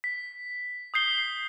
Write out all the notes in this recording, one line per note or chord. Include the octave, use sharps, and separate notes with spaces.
B6
D#6 G6 C7 G7